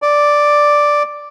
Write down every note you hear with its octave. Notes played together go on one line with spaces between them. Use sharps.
D5